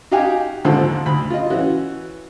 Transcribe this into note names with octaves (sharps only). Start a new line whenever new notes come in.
D#4 F#4 G4 F5 G5 G#5
D#2 G#2 D3 F3 A4 C5
D2 B5
F4 D#5
E3 C#4 F#4